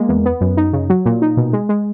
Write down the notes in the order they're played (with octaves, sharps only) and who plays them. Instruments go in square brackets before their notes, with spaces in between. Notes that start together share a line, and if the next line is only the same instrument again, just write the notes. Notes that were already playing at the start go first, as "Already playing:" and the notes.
Already playing: [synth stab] G#3 A#3
E2
B3
F#2
D#4
C#3
F#3
A#2
D#4
B2
G#3
G#3